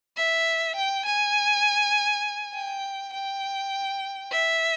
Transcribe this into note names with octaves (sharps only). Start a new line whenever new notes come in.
E5
G5
G#5
G5
G5
E5